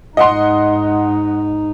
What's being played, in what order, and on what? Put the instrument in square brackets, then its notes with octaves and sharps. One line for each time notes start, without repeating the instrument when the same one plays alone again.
[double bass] G#2 D#4 [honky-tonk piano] D#5 F#5 C6